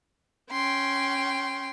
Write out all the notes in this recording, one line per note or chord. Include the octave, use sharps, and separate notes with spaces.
C#4 G5 C6